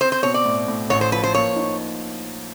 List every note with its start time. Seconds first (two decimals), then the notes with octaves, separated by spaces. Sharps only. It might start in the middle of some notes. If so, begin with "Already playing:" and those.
0.01 C4 C5
0.12 C5
0.23 B2 C#5
0.34 D5
0.45 A2
0.68 A2
0.90 A1 C#5
1.01 C5
1.12 F3 B4
1.23 C5
1.34 A#3 C#5
1.56 D#4